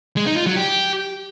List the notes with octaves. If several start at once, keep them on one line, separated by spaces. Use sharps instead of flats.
G#3
D#4
F4
F#3
G4